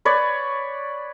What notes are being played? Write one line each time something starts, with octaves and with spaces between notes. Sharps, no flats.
B4 C#5 D5